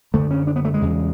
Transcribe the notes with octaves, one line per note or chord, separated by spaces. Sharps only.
F#2 D3 A3
C#4
D4
B3
A3
G#3
E2 C#3